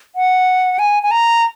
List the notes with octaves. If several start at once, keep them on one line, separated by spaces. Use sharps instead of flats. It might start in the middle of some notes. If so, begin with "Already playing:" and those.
F#5
G#5
G#5
A#5